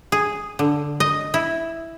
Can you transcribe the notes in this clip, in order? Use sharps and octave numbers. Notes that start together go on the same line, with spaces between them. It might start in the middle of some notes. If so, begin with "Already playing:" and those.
G#4
D3
D#5
E4